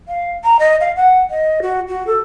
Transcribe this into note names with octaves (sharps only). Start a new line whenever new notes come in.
F5
A#5
D#5
F5
F#5
D#5
F#4
F#4
A4